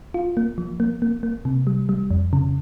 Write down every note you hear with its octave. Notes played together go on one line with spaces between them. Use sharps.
F4
A#3
F3
A#3
A#3
A#3
C3
G3
G3
F2
C#3